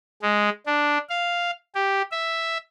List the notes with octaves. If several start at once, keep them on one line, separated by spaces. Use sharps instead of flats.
G#3
D4
F5
G4
E5